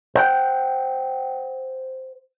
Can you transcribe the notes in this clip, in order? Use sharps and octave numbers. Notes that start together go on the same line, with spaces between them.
C5 F#5 G5